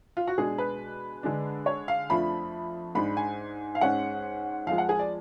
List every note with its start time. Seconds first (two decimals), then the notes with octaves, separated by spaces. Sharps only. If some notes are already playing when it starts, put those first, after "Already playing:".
0.17 F4
0.27 F#4
0.38 B2 G#3 D4 G#4
0.58 B4
1.23 D3 G#3 D4
1.66 C#5
1.88 F5
2.10 F2 F3 A3 D4 B5
2.95 G#2 G#3 D4 B5
3.17 G#5
3.75 F5
3.81 G#2 G#3 C#4 F#5
4.67 F2 F3 G#3 F5
4.78 F#5
4.89 G#4
4.99 D5